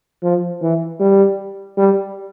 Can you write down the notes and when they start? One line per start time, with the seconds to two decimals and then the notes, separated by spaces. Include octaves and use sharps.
0.23 F3
0.62 E3
1.00 G3
1.78 G3